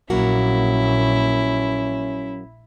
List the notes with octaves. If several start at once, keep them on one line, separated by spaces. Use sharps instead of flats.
A#1 F#3 A#3 C#4 E4 F#4